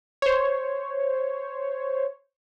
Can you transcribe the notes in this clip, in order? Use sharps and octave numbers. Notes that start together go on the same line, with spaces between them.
C5 C#5